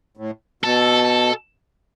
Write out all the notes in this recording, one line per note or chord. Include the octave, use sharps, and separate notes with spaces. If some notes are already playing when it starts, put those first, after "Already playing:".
A2
B2 A4